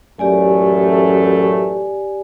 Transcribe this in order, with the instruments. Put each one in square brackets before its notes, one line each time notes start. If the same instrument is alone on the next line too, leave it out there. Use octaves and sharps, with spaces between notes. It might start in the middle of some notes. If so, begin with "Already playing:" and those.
[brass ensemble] A1 F#2 A3 [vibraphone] G4 D5 G#5